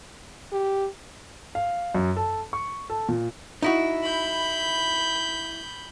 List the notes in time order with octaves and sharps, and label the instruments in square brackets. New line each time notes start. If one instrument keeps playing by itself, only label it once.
[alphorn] G4
[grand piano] F5
F#2
A4
C#6
A4
A#2
[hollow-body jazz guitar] D#4 E4 F#4
[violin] B5 G6